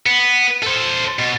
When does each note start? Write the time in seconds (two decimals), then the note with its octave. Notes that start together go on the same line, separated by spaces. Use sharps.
0.06 B3
0.63 A4 C5
1.19 B2